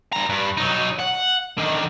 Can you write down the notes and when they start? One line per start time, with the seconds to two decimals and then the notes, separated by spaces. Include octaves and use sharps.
0.13 G2 A#5
0.29 G2
0.57 F#3 D#4
1.00 F#5
1.58 D3 D#3